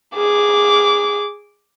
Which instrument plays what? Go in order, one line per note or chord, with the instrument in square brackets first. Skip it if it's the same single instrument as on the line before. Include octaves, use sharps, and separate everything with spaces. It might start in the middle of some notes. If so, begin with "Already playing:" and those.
[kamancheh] G#4 D6